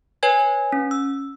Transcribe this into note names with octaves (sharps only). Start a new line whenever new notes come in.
B4 C#5 G#5 G#6
C#4
E6